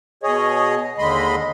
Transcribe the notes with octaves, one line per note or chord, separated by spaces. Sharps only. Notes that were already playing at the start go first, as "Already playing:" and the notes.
B2 G#4 C#5 D#5
D#2 D3 G#3 D#5 B5 C6